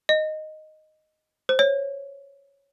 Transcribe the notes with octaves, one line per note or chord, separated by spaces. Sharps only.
D#5
C5
C#5